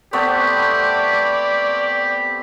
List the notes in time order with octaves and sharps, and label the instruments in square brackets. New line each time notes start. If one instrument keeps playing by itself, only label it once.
[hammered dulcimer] A3 B3 C4 [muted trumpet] G4 [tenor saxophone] D5